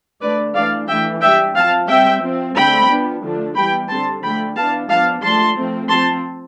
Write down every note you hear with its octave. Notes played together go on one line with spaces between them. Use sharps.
D3 A3 D4 B4 D5
E3 A3 D4 D5 F5
E3 A3 D4 E5 G5
G3 D4 E5 G5
F3 C4 F5 A5
G3 C4 E5 G5
F3 C4
D3 A3 C4 G5 B5
F3 B3 D4
D3 F3 A3 D4
E3 G3 B3 G5 B5
D3 G3 C4 A5 C6
D3 F3 A3 G5 B5
E3 B3 D4 F5 A5
F3 B3 D4 F5 A5
F3 A3 D4 A5 C6
F3 A3 C4
F3 C4 A5 C6